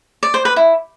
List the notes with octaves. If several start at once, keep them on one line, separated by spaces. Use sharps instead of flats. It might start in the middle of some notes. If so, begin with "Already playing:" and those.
D5
C5
B4
E4